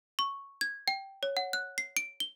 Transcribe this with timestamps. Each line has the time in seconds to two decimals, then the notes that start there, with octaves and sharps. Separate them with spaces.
0.19 C#6
0.61 G#6
0.88 G5
1.23 C#5
1.37 F#5
1.53 F#6
1.78 C7
1.97 D7
2.20 G7